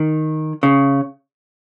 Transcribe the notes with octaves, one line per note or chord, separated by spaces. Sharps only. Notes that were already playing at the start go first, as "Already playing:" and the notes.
Already playing: D#3
C#3